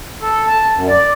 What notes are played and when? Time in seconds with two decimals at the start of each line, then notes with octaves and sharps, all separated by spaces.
0.21 A4
0.47 A5
0.73 F#2
0.87 D5